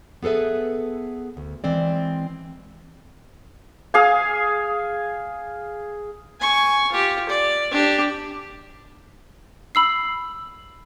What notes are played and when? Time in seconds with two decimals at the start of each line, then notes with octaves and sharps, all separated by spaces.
0.23 B3 G#4 A4 B4 E5
1.37 D2
1.64 E3 G#3 C4 D5
3.94 G#4 F5 G#5
6.40 G#5 C#6
6.92 F4 G4
7.28 D5
7.71 D4 G4
9.75 B5 E6 C7